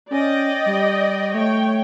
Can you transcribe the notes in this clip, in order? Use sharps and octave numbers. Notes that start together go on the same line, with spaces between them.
C#4 D5 D#5 G5
G3
A3 C#5 G5